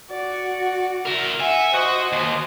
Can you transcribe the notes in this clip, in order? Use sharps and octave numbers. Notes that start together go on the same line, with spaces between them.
F#4 D5
E4 A#4
E5 F#5 G#5
F#4 C5 D#5
D#2